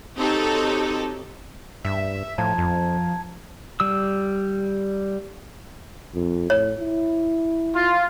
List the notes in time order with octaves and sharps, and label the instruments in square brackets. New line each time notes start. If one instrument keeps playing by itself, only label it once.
[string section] C4 D#4 F#4 G4 A4 C#5
[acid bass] G2 [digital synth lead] E5
[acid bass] A2 [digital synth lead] F3 [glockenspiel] A5 A#5 G#6
[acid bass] F2
[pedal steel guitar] G3 E6
[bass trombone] F2
[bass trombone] A2 [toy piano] C#5
[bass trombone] E4
[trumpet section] F4